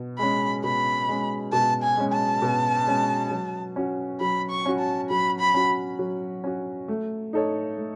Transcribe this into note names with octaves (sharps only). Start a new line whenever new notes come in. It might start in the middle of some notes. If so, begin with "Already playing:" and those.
Already playing: B2
G#3 C#4 B5
B2 B5
G#3 C#4
B2 A5
G#5
G#3 C#4
A5
B2
G#3 C#4
F#3
C#4 F#4
F#3 B5
C#6
C#4 F#4
A5
F#3 B5
B5
C#4 F#4
F#3
C#4 F#4
A3
D#4 A4 C#5
A3